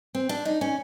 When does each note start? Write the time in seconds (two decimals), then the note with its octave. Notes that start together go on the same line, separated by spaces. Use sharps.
0.15 C4
0.29 D4
0.45 D#4
0.61 C#4